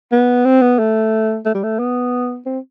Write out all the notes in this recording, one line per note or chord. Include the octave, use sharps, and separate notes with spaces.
B3
C4
B3
A3
A3
G3
A3
B3
C4